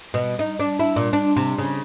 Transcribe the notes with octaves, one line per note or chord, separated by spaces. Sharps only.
B2
D#4
D4
E4
A#2
D4
C3
C#3